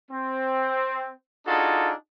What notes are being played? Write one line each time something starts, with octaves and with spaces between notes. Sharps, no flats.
C4
D4 D#4 F4 F#4 G#4 A4